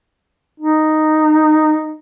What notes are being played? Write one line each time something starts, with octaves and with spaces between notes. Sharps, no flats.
D#4